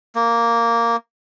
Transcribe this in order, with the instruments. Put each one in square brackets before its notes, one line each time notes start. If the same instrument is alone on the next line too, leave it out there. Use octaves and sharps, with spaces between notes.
[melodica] A#3